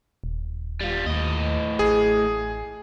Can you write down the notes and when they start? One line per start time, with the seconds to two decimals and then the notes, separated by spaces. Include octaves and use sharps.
0.24 D#1
0.81 G3 F4
1.06 D#2 A2 D#5
1.79 A1 G#4